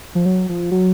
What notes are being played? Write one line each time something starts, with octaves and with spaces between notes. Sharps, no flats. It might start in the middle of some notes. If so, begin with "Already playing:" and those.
F3
F#3
F3
F#3